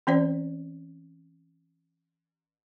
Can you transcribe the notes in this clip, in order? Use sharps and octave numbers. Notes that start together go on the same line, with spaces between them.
E3 C4 C#4 C5 D5